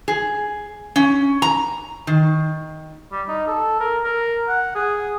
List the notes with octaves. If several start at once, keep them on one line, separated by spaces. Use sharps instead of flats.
G#4
C#4
A#5
D#3
G3
D#4
A4
A#4
A#4
F#5
G#4